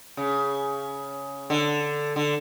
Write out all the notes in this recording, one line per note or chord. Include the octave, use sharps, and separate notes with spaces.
C#3
D3
D3